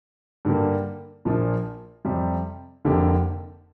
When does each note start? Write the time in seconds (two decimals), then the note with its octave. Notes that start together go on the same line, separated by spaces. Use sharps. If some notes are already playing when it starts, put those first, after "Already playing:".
0.45 G2 D3 G3 A#3
1.25 A#1 A#2 F3 A#3 D4
2.05 F2 C3 G3
2.85 F1 F2 D3 A#3 G4